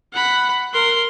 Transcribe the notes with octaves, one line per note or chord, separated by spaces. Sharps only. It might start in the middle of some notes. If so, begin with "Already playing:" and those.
F#5 B5
A#4 C6